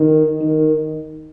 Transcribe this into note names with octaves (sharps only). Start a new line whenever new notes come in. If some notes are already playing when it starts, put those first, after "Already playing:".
Already playing: D#3
D#3